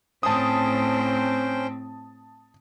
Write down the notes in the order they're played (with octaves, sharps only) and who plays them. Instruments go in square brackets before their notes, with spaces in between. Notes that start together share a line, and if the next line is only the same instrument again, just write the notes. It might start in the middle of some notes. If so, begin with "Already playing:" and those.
[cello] A2 C4 [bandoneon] C#4 C5 G5 [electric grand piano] A5 D#6